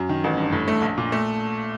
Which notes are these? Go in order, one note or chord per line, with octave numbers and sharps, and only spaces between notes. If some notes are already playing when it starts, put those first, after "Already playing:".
Already playing: F#2
D#3
A1
G2
A2
A3
A#1
A#2
A3